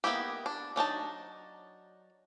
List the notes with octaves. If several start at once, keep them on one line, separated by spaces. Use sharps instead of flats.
A#3 B3 D#4 E4 G4
D4
F#3 D4 D#4 A5